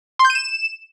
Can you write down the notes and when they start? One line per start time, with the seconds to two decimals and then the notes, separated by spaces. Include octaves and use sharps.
0.19 C6
0.25 G6
0.30 D#7
0.35 E7